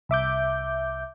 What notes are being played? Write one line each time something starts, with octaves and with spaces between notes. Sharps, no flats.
C2 E5 D6 G6